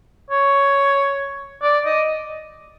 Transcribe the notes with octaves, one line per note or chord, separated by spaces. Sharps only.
C#5
D5
D#5